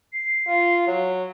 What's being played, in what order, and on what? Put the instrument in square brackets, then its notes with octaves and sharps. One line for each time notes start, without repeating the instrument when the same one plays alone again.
[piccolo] C7
[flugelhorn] F4
F#3